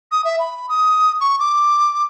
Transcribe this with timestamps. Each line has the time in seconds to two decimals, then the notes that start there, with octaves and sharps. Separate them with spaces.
0.12 D#6
0.25 E5
0.39 B5
0.69 D#6
1.21 C#6
1.39 D6